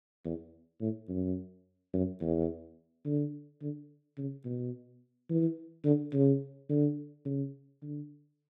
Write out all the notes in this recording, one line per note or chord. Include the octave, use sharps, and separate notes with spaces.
E2
A2
F#2
F#2
E2
D3
D3
C#3
B2
E3
D3
C#3
D3
C#3
D3